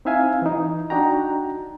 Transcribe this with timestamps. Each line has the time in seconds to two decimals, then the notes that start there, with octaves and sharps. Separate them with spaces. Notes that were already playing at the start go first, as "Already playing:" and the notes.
0.05 C4 D#4 E4 E5 F5 G#5
0.42 E3 D#4
0.90 D4 D#4 F#4 G5 A#5